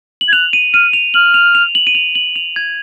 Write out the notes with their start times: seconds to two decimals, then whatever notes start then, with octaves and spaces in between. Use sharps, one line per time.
0.21 F#7
0.28 G#6
0.33 F#6 F7
0.53 D#7
0.74 F6 D#7
0.93 F7
1.14 F6 F#7
1.34 F7
1.55 F7
1.75 F#7
1.87 D#7
1.95 F7
2.15 F#7
2.36 F7
2.56 G#6